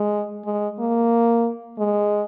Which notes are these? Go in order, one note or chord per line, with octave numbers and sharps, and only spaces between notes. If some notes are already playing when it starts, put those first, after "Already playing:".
Already playing: G#3
G#3
A#3
G#3